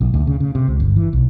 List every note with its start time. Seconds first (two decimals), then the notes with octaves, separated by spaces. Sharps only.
0.01 B1
0.14 D2
0.27 C#3
0.40 C#3
0.55 C3
0.68 C#2
0.80 G1
0.96 E3
1.13 B1